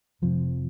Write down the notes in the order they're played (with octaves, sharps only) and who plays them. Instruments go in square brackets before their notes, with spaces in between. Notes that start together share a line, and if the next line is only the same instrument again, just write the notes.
[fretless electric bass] F1 F2 C3 F3